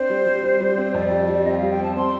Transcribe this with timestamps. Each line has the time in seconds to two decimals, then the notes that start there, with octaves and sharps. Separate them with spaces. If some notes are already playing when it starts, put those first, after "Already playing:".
Already playing: C4 D4 C5
0.10 G3
0.27 G3
0.44 G3
0.61 G3
0.77 C4
0.94 F2 D5
1.11 G3
1.28 G3
1.45 C4 D#5
1.53 G5
1.58 G3 F5
1.70 G5
1.79 C4 A5
1.96 C4 C6